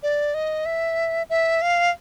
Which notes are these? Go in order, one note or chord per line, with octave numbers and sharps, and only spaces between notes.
D5
D#5
E5
E5
F5